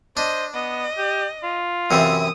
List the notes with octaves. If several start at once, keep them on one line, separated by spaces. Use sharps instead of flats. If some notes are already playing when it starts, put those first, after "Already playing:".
D4 C5 D#5
B3 D#5
G4
F4
F#2 C3 E3 D#6